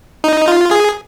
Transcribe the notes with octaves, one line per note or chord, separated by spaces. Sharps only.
D#4
F4
G#4